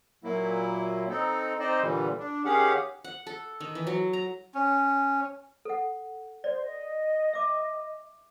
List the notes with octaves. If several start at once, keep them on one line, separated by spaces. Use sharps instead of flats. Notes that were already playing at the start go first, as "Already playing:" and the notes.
A#2 F#3 A#3 E4
C4 D#4 A4
C4 D#4 C5 D5 D#5
A#2 D3 E3 G3
D4
D#3 C#4 G4 G#4 F5 F#5
F#5
A4
D#3
E3
F#3
A#5
C#4
A4 F#5
C5 D5
D#5
E5 D6